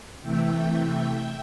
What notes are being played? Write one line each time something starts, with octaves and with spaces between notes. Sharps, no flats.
C3 E3 A3 E5 G5